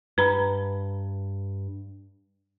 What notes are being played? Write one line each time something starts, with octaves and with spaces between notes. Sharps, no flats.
G2 B4 A#5 B5